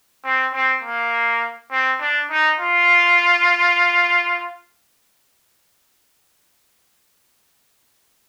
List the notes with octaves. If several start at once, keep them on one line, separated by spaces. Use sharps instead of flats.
C4
C4
A#3
C4
D4
D#4
F4